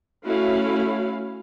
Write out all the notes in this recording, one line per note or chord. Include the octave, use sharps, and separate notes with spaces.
A3 C#4 E4 F#4 F5